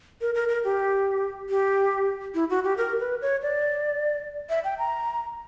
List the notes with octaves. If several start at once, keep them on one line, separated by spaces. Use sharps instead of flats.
A#4
A#4
A#4
G4
G4
E4
F#4
G4
A#4
B4
C#5
D5
E5
G5
A#5